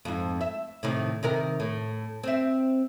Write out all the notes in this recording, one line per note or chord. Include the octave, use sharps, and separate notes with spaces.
F2 G#2
E5
A2 C3 D#3
C3 D#3 A#4
A2
C4 E5